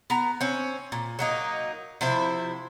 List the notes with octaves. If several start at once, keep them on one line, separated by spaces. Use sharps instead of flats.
B3 A#5
C4 C#4
A#2
F#3 A#3 D#4
C3 F3 E4 C5